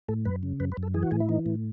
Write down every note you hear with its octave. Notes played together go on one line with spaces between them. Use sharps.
A2 A4
F#2 B4
C#3
F#2 B4
B4
F#2
A4
E3 G#4
F#4
A2 G#4
E4
E3 D#4
A2